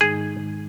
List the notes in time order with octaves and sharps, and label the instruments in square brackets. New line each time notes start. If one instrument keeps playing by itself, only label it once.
[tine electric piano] G#2 D#3 G#3 D#4 [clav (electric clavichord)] G#4